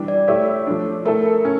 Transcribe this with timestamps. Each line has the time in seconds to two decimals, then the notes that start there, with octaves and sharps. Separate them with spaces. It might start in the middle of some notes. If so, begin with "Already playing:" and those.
Already playing: E3 G3 D4
0.08 D5
0.28 A3 E4 G4 C#5
0.67 F3 A3 D4
1.05 A3 E4 A4 A#4
1.25 A4
1.45 C#4